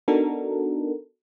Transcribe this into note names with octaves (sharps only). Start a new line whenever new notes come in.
B3 D4 D#4 F#4 A4 A#4